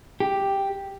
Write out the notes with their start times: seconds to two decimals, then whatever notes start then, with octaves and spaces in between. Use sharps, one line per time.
0.20 G4